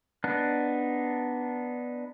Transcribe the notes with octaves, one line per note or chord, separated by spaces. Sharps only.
B3 D4 D#4 F#6